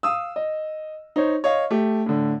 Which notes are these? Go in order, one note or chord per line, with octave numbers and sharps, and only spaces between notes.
F5 D#6 E6
D#5
D#4 C5 C#5
C#5 D#5 F5
A3 G4
A2 D3